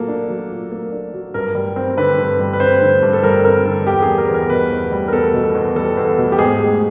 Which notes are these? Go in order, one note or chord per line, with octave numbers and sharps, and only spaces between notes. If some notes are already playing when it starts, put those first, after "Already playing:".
Already playing: A#2 F#3 A#3 A4
D4
F#3
A#2
A#3
D4
F#3
G2 A#4
G3
C4
D3 B4
G2
G3
B4
C4 C5
D3
G2
A4
G3 A#4
C4 A#4
D3 A4
E2 G4
G#4
G3
A#4
E2
A#4
B2 B4
E2
G3
A#4
E2 A4
B2
E2
G3 A4
E2
B2
G4
G#2 G#4
A3